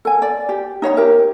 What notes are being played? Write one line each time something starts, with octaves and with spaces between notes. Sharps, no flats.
A4 G#5
D5
G4
D#4 C#5 F5 A#5
G4 A#4 E5